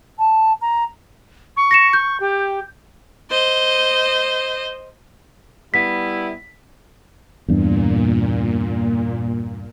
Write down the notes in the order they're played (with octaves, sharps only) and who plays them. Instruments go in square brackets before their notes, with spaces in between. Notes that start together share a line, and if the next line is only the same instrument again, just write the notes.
[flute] A5
A#5
[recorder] C#6
[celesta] A#6 C#7 E7
G6
[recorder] G4
[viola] C5 D#5
[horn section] G3 B3 E4 [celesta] B6
[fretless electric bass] E2 G2 [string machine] A#2